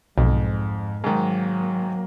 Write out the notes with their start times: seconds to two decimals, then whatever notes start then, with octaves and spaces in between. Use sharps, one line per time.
0.18 B1 F2 G#2
1.04 G#2 D#3 F#3 A#3